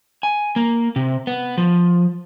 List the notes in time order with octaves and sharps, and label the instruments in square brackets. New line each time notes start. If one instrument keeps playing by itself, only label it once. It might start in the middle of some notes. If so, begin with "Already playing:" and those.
[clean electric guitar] G#5
A#3
C3
B3
F3